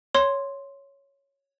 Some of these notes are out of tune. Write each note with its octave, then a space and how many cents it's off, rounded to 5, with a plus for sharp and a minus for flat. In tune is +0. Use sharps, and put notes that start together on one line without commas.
C#5 +0 C6 +0